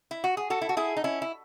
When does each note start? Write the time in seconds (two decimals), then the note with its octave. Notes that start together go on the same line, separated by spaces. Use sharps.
0.11 E4
0.24 F#4
0.37 G#4
0.50 F#4 A4
0.61 E4
0.69 F#4
0.77 E4 G#4
0.97 D#4
1.04 C#4 E4
1.22 E4